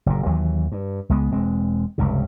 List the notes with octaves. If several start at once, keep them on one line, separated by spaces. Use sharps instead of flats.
F#1 A#2
D#2 E3 F#3
G2
C#2 G#3 B3
E1 G#3 C4
F1 C#2 G2 C3